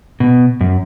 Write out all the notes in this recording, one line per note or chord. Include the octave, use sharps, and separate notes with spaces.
B2
F#2